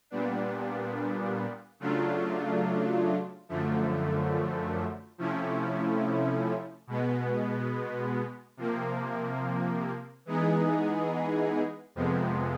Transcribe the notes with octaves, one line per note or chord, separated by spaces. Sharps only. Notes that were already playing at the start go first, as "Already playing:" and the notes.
A#2 G3 B3 D4
C#3 F#3 A3 D4 F4
F#2 D3 F3 A3
C3 F3 A3 C#4 E4
B2 G#3 B3
C3 F3 A#3
E3 G#3 B3 D#4 G#4
F2 C3 F3 G#3 B3